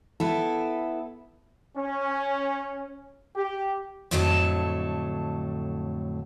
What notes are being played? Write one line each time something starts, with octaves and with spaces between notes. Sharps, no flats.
B3 E4 A4
C#4
G4
F2 A2 D3 F#3 A4 A5